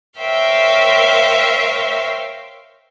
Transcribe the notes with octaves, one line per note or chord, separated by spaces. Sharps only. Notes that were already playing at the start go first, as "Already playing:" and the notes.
A#4 C5 C#5 E5 F5 G5